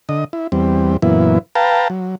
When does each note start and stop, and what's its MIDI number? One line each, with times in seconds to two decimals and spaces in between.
0.09 0.24 50
0.09 0.24 75
0.33 0.47 64
0.52 0.97 40
0.52 0.97 55
0.52 0.97 60
1.02 1.39 42
1.02 1.39 46
1.02 1.39 52
1.02 1.39 59
1.02 1.39 64
1.55 1.88 71
1.55 1.88 77
1.55 1.88 79
1.55 1.88 81
1.55 1.88 82
1.90 2.15 54